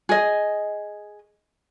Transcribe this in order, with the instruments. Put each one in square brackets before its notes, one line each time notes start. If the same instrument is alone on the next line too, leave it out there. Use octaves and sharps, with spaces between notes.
[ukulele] G#4 D#5